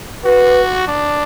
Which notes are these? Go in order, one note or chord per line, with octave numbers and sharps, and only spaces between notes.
F#4 B4
D4